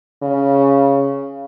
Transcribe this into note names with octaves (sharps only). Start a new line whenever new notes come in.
C#3